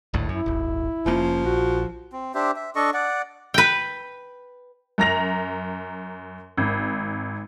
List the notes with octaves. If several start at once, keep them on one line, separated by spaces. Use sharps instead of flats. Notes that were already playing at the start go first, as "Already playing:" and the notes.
G#1 D2 A2
F#2 E4
D#1 G#1
F1 F3 A#3 C#4
A#1 F#4
C4
D4 G4 C5 E5
E5
D4 A4 D#5 C#6
D5 F#5
B4 G5
F#2 A#5 A#6 F7
G#1